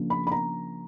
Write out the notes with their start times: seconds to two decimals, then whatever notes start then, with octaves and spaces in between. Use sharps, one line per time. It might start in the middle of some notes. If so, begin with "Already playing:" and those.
Already playing: C#3 F3 A#3 D4
0.10 B5
0.27 B5
0.32 A#5